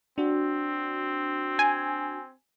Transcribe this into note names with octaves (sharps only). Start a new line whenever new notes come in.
C4 D4 F#4
G#5